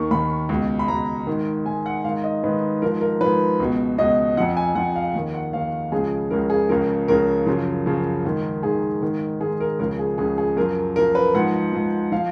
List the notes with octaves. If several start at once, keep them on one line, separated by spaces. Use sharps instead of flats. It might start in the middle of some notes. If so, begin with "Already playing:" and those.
Already playing: D#2 D#3 C#6
D#2 D#3 B5
C#2 B2
B5
C#2 B2 A#5
G#2 D#3
G#2 D#3 G#5
F#5
G#2 D#3 F5
D#5
G#2 D#3 B4
G#2 F3 A#4
A#4
G#2 F3 B4
C#2 B2
C#2 B2 D#5
F2 F3 F#5
G#5
F2 F3 F#5
F5
D#2 D#3
F#5
D#2 D#3 F5
C#2 C#3 F3 G#4
C#2 C#3 F3 A#4
G#4
C#2 C#3 F3 A#4
C#2 C#3 F3 A#4
F#2 C#3 F3
F#2 C#3 F3
G#2 D#3
G#2 D#3 G#4
G#2 D#3
G#2 D#3 G#4
A#4
C#2 C#3 F3 A#4
G#4
C#2 C#3 F3 G#4
G#4
F#2 F3 A#4
F#2 F3 A#4
B4
G#2 F3 F#5
G#2 F3
F3 F5